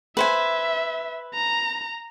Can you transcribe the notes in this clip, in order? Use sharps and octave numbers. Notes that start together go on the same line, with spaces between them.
B4 C5 E5 G#5
A#5